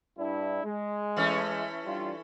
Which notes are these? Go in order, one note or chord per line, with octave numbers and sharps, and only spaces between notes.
G2 D4 E4
G#3
E3 A3 C#4
G3 D4 F4